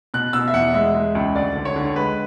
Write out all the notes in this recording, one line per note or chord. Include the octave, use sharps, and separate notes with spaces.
B2 F#6
B2 E6
E5
E2 F#5
G#3 E5
G#3
C#2
D2 D5
D3
C#5
D3
G#3 B4